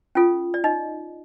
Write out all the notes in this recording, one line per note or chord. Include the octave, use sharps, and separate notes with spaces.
C#4 F4 A4
D5
D#4 D#5